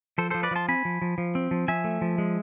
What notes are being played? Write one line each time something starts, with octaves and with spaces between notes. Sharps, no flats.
F3 A4 C5
F3 A4 C5
B4 D5
F3 A5 C6
C4 G#5 B5
F3
F3
F3
C4
F3
F3 E5 G#5
A3
F3
G#3